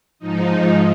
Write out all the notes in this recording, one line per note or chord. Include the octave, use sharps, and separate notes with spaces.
G#2 F3 D#4